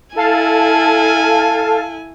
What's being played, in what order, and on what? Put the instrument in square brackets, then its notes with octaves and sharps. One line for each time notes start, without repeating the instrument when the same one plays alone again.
[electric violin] E4 G#5 [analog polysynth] A4 F5 A5